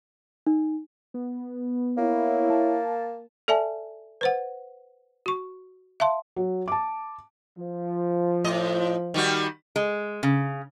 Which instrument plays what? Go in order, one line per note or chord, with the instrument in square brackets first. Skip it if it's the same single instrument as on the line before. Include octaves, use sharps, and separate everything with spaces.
[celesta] D#4
[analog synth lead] B3
[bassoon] A#3 [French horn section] E4 C#5
[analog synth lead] A5
[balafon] A4 D5 E5 G#5 A5
B4 C5 F#5
F#4 C#6
E5 F5 A5 C6
[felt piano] F#3
A5 D6
[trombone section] F3
[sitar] A2 D#5
D#3 G3 F#4
[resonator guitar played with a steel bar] G#3
C#3